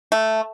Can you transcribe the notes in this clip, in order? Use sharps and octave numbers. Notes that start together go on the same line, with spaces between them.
A3